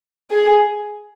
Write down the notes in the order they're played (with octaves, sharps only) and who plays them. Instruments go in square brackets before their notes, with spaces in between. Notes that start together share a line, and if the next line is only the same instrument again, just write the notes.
[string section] G#4